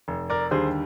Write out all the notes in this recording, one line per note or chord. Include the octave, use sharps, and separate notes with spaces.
F1
A#4 D5
D#2 D3 G3 G#4 C5